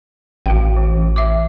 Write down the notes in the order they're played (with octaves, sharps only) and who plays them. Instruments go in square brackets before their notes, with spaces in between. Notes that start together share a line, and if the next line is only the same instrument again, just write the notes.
[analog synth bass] A1 [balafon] F#4 F5 G5
[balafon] E3
E5 D6